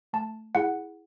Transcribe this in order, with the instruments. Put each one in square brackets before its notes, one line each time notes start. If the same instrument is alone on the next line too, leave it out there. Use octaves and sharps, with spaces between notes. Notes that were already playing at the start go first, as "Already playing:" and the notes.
[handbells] A3 A5
E4 G#4 F#5